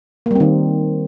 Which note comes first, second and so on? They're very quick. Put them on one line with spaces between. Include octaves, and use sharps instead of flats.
A#3 G3 C4 D#3